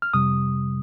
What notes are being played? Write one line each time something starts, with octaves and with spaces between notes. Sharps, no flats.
F6
F2 C3 G3 D#6